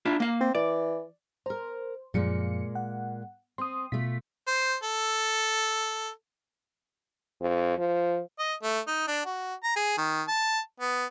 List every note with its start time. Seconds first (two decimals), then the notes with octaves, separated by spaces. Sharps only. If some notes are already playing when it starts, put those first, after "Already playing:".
0.05 D4 E4 F4
0.20 A#3 F5
0.41 C4
0.55 E3 D5
1.46 A#4 C5 A#5
2.14 F#2 A#2 F3 G#3 A#3 C#7
2.75 F#5
3.58 C4 C6 D#6
3.92 B2 A3 F4 B6
4.47 C5
4.83 A4
7.41 F2
7.78 F3
8.39 D#5
8.63 A3
8.88 D#4
9.08 D4
9.26 F#4
9.64 A#5
9.76 G#4
9.98 D#3
10.28 A5
10.80 B3